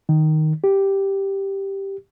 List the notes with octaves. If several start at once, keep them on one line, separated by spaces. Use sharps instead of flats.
D#3
G4